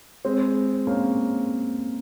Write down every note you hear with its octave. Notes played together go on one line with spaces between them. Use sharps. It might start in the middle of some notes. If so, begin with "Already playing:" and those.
G#3 C4
A#3 C#4